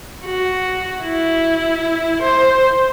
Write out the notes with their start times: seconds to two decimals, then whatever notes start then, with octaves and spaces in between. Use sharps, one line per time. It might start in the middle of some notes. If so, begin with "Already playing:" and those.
0.25 F#4
1.04 E4
2.22 C5